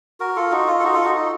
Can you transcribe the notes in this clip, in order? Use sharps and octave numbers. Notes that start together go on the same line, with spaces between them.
F#4 A#4
F4 A4
D#4 F#4
F4
A4
D#4 F#4
F4 A4
D#4 F#4
D#4